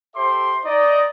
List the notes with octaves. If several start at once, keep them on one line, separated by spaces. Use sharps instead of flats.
G4 A4 C5 E5 C6 D6
D#4 D5 D#5